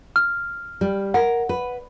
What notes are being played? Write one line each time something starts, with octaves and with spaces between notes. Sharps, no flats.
F6
G3
A#4 F#5
B4